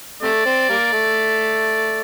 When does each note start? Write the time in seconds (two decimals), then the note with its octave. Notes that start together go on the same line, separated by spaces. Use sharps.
0.22 C3 A3 D5
0.46 C4
0.69 G3 A#3
0.92 A3